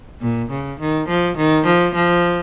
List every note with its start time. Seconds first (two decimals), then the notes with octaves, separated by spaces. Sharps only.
0.21 A#2
0.50 C#3
0.80 D#3
1.09 F3
1.37 D#3
1.66 F3
1.95 F3